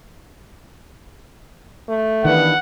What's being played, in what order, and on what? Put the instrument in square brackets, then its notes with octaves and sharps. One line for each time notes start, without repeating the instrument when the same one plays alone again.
[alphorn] A3
[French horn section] G2 B3 [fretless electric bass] D#3 E3 [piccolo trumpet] F#5